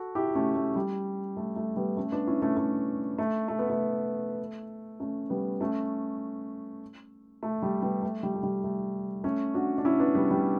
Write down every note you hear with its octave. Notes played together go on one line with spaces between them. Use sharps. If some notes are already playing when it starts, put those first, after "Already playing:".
Already playing: F#4 A4
E4 G4
A3 C#4
A3
G3
A3
A3
G3 B3
A3 C#4
B3 D4
C#4 E4
A3 C#4
A3
A3
A3
B3
A3
A3 C#4
G3 B3
A3 C#4
A3
G3
G3 B3
A3
G3
A3
G3
A3
A3 C#4
D4 F#4
D4
C#4 E4
B3 D4
G3 B3
G3